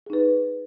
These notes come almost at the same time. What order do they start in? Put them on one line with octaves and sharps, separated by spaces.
G#4 D#4 B4